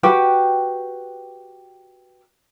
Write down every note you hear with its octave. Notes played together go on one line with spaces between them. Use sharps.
F#4 G4 B4 G5